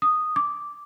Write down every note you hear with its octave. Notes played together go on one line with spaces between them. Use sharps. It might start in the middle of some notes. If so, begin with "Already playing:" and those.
D#6
D6